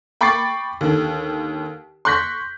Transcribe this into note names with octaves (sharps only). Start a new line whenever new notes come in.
G5 B5 C#6 D6 A6 C7
D#2 D3
C6 C#6 F#6 G6 A#6 B6